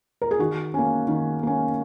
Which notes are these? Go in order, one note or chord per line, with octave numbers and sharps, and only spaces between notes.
A#4
G#4
D#3 F#4
A#3 C#4
D#3
A#3 C#4